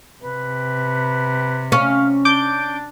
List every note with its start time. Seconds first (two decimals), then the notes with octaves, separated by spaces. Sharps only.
0.23 C3 B4
1.72 C#4 F5
2.25 D4 D6 G6 D7